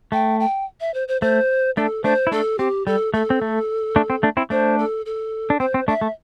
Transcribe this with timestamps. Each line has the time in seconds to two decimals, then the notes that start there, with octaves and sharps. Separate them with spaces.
0.12 A3 G5
0.40 G5
0.80 E5
0.94 C5
1.08 C5
1.21 A3 C5
1.77 A3 D4 A4
2.04 A3 D4 C5
2.27 E4
2.32 A3 D4 A4
2.59 C4 G4
2.87 G3 A4
3.14 A3 A4
3.30 C4
3.42 A3
3.96 A3 D4
4.10 C4
4.23 A3 D4
4.37 C4 E4
4.50 A3 D4 C5
4.79 A4
5.06 A4
5.50 D4
5.60 C4 C5
5.74 C4
5.88 A3 D4 E5
6.01 A3